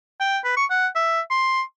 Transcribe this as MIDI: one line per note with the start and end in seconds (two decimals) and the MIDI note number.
0.20 0.38 79
0.44 0.54 71
0.57 0.65 85
0.70 0.87 78
0.95 1.21 76
1.31 1.62 84